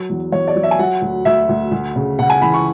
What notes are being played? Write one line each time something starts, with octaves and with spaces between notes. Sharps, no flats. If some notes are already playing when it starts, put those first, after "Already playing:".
Already playing: F#3
E2
E2 C#5
D5
F#3
E5
G#5
F#3 F#5
D2
D2 E5
D2
D2
C#3
C#3 F#5
G#5
E3 B5
C#6